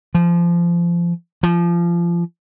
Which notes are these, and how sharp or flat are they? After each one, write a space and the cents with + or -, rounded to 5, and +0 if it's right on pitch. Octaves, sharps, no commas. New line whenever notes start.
F3 -25
F3 -25